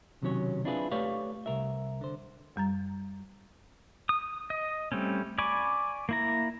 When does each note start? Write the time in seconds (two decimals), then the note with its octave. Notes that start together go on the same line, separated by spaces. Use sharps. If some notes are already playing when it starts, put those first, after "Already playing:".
0.22 B1 C3 D#3 F#3 C#4 C#5
0.65 C4 D4 E4 F4 G#4 B4
0.91 A3 G4 B4 C#5 D5 F5
1.46 C2 A#4 E5
2.01 D3 C5
2.56 F#2 G3 A#5 A6
4.09 D#6
4.50 D#5
4.92 G3 A3 C4 C#4
5.38 D5 G#5 B5 C#6 D6
6.09 A#3 E4 A#5